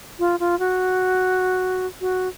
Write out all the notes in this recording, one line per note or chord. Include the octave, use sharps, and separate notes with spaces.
F4
F4
F#4
F#4